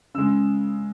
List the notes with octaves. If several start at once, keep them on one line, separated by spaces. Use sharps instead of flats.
C#3 G#3 E6